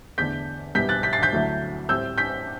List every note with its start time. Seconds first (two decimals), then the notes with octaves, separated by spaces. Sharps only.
0.18 E2 D3 A3 D4 G6 B6
0.75 C2 B2 G3 B3 G6 B6
0.89 F#6 A6
1.03 G6 B6
1.13 A6 C7
1.22 G6 B6
1.32 D2 D3 F#3 A3 E4
1.89 A2 G3 C4 E6 G6
2.18 G6 B6